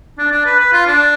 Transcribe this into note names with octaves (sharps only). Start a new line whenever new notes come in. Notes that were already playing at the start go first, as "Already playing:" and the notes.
D4
D4
B4
B4
F4
D4